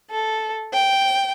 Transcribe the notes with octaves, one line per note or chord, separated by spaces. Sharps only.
A4
G5